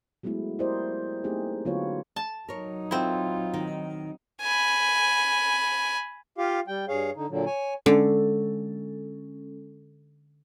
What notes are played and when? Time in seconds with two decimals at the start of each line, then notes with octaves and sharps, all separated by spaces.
0.23 F#3 G#3 A3 B3 E4
0.59 E4 G4 A#4 C5 D5 D#5
1.24 A3 A#3 C4 D#4 G4 G#4
1.65 D3 F#3 B3 F4 B4 C#5
2.16 A5
2.49 F#3 D#4 A#4 C#5
2.91 C4 E4 F4
3.54 D#3
4.41 G#5 B5
6.38 F4 G4 F5
6.67 G3 G5
6.88 G2 G#4 C#5 F5
7.16 D3 D#4
7.29 A#2 D3 F#3
7.46 C#5 G#5
7.86 D3 G#3 C#4 A4